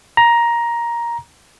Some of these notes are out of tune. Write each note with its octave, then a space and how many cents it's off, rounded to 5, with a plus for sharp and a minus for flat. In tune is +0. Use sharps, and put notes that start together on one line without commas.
A#5 +10